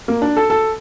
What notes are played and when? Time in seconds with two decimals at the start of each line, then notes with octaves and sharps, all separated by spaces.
0.08 A#3
0.22 D4
0.36 A4
0.50 A4